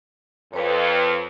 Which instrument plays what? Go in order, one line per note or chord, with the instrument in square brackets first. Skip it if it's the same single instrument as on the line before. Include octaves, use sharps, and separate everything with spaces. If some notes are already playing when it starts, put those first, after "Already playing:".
[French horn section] F2 [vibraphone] B4 C#5